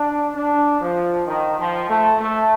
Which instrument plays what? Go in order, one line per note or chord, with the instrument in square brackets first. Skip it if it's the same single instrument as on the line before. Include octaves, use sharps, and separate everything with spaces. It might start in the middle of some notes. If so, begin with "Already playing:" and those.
Already playing: [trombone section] D4
D4
F3
D#3
F3
A3
A3